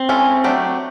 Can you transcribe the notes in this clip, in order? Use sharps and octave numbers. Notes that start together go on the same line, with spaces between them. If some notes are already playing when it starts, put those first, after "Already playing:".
Already playing: C4
G#3 C#4 E4 A4
F#3 A3 D4 G4